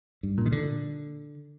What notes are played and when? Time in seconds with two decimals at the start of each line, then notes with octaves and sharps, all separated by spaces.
0.23 G2
0.38 A#2
0.46 D#3
0.52 D3